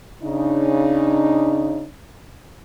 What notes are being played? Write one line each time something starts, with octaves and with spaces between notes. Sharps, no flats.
C#3 D4 D#4